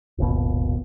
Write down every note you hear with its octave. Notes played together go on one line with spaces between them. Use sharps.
D#1 G#1 D#2 B2